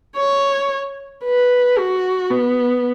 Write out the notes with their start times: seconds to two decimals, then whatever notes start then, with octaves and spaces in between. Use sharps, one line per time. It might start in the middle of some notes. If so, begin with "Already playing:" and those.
0.17 C#5
1.24 B4
1.78 F#4
2.31 B3